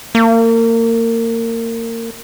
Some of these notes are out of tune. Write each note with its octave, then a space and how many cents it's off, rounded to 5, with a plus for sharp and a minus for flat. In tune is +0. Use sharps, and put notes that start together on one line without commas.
A#3 -30